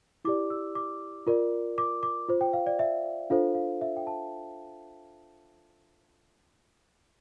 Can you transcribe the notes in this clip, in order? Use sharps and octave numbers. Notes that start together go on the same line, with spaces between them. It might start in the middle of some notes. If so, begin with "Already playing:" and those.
E4 G4 D5 D6
E6
D6
F4 A#4 D5
D6
D6
F4 C5
G5
F5
D5
E5
D4 F4 A4 C5 F5
F5
E5
G5
A5